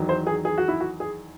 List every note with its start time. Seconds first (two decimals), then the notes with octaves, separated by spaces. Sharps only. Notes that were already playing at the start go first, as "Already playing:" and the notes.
Already playing: E2 D#3 F#3
0.09 C5
0.27 G#4
0.45 G#4
0.58 F#4
0.68 E4
0.80 F#4
1.00 G#4